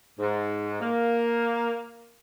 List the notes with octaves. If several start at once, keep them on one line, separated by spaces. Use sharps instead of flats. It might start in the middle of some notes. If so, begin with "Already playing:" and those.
G#2
A#3